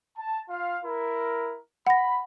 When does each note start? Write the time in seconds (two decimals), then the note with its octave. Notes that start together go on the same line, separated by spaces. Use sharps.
0.18 A5
0.49 F4 F5
0.85 E4 A#4
1.87 F#5 B5 A#6